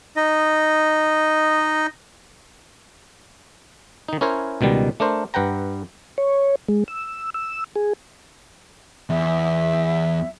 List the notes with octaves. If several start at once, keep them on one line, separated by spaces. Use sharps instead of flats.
D#4 D#5
D#3 D#4
C#4 E4 A#4 C5 C#5
C#2 B2 D#3 G3
A3 D4 A#4 C5
G2 B4 F#5 G5 A#5
C#5
G#3
E6
E6
G#4
E2 E5